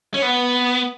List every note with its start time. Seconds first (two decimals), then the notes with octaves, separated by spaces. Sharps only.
0.14 C#4
0.22 B3